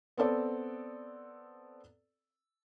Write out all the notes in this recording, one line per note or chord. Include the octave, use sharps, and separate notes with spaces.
B3 C4 A4 D5